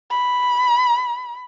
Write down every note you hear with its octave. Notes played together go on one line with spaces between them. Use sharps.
B5